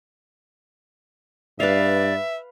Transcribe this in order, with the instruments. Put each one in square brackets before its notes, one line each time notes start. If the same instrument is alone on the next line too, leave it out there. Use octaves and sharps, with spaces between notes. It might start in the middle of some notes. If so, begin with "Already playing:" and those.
[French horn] G2 [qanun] B4 F5 [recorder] D5 [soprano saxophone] E5